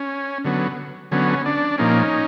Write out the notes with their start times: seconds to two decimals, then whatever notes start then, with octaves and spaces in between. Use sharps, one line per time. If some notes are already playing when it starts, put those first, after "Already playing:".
Already playing: C#4
0.44 D3 F#3 B3
1.12 D3 F#3 B3 C#4
1.46 D4
1.78 A#2 F3 A#3 C#4 D#4